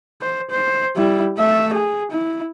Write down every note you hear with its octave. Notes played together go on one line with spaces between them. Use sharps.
C5
C5
G3 E4
A3 E5
G#4
E4